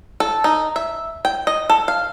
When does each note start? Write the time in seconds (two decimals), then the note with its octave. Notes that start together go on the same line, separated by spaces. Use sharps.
0.20 A4
0.44 D#4
0.76 E5
1.25 G5
1.47 D#5
1.70 A4
1.88 F5